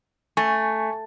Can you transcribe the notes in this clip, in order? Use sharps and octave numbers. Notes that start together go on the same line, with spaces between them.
A3 G#5 C#6